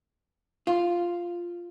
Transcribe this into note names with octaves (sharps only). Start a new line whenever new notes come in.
F4